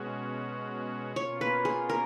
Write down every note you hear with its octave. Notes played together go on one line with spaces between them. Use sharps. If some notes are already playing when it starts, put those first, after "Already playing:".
Already playing: B2 G#3 C#4 F#4
B2 A#3 C#4 F4 C#5
B4
G#4
A#4